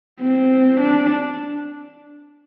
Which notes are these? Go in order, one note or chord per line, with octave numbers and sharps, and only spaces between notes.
C4
D4